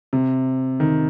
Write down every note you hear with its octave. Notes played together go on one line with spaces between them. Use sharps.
C3
D#3